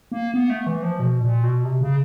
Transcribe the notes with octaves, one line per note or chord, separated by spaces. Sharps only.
A#3
B3
A3
E3
F3
B2
A#2
B2
C3
C#3